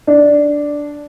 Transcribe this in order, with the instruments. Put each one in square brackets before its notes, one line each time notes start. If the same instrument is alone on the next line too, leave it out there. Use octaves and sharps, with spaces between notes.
[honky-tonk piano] D4